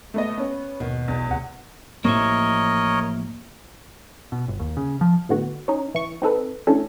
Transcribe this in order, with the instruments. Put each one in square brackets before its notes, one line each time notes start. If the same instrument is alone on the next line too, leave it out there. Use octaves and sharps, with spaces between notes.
[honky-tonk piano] A3 B3 D#5
B3 C#4
[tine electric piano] G#1 D#2 [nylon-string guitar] B2 [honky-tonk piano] D#3
[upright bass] B1 [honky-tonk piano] E2
[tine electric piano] G1 C3 F#5 [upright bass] D2
[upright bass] A1 F3 [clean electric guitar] A#3 C5 E5 [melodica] A#4 C#5 D#5
[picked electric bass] B2
G1
D#2
C#3
F3
[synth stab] A2 D3 B3 F#4
C#4 D#4
E3 C#6
C4 D#4 A4 B4
E3 A3 C#4 D4 A4